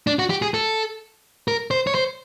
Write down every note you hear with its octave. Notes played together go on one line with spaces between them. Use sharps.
D4
F#4
G4
G#4
A4
A#4
C5
C#5
C5